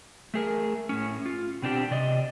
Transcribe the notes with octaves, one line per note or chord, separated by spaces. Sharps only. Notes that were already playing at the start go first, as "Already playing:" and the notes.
A3 G#4 A#4
A2 C#4
F4
B2 C4 D4 G4
C3 D5 D#5